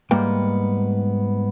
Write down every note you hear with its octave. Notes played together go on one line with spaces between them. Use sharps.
G#2 G3 A#3 B3 G5